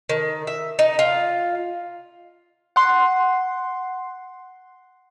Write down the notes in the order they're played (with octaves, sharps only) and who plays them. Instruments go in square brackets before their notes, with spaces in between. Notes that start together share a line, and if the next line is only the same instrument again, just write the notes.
[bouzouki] D#3
E5
D#4
F4
[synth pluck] F#5 C6